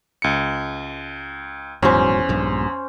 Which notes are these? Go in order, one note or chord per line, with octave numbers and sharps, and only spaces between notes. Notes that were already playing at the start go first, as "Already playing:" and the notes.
C#2 C#7
D#1 E2 G#2 F#3 C#4 C5
A#1 G2